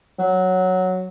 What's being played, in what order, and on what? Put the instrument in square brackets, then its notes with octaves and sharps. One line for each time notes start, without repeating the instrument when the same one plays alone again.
[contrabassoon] F#3